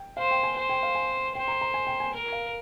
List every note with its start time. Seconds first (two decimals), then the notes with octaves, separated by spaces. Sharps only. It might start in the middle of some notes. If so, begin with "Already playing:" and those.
Already playing: G5
0.17 C5 F5
0.31 G5
0.43 G#5
0.57 C5 G#5
0.69 G5
0.83 F5
0.95 G#5
1.35 C5 G5
1.48 A#5
1.61 A#5
1.74 G#5
1.87 G5
2.00 G#5
2.13 A#4
2.32 F5